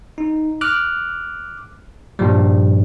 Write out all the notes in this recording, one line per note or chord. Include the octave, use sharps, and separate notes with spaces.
D#4
D6 F6 F#6
G2 A#2 F3 G3